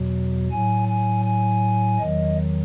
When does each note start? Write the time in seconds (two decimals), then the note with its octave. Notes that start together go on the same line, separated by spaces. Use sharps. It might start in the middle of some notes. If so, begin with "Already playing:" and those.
Already playing: E2 B2 F#3
0.50 A2 F#3 G#5
0.88 G#5
1.25 G#5
1.98 E2 D#3 F#3 D#5